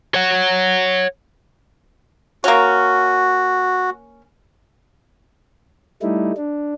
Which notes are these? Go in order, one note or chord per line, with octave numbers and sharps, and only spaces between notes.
C#5 F#5
A#3 C#4 F#4
G3 A3 D#4 E4
D4